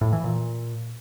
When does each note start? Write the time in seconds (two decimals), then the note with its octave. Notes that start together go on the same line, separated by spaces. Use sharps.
0.01 A2
0.13 E3
0.24 A#2